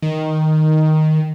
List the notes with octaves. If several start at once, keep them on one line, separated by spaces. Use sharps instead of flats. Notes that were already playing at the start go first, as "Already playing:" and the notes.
D#3